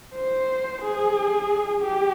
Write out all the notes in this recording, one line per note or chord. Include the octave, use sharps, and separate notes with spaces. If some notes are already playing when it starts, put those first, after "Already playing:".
C5
G#4
G4